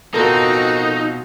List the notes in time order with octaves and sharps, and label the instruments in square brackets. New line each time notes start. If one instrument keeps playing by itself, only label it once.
[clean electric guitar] B2 F3 C4 [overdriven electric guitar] D#4 [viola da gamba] F#4 [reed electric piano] A4 A#4